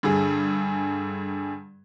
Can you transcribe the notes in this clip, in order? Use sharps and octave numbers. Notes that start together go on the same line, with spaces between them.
G2 D3 G#4